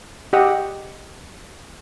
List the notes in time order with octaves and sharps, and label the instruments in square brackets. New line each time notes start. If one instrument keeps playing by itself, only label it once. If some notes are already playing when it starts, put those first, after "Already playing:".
[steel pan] G4 D#5 F#5